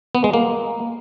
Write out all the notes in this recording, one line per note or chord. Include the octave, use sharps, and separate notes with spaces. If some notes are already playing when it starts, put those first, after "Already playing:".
B3
G#3
A#3